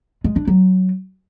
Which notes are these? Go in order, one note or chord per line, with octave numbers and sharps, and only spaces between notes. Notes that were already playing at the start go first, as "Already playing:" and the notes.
G#3
D4
F#3